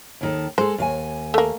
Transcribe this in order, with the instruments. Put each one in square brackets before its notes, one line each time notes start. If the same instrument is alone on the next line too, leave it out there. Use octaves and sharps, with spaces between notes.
[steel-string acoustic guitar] D#2 D#3 A4
[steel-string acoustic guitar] G#3 A4 [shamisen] C5
[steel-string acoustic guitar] D#2 F5 G#5
[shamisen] A3 A#3